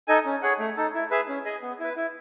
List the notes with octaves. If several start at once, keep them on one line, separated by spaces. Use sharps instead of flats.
D#4 A4 D#5 G#5
C#4
G#4 C#5 F#5
A3
D#4 A4
E4
G#4 B4 E5
C#4
G#4 D#5 G#5
B3
E4 B4
E4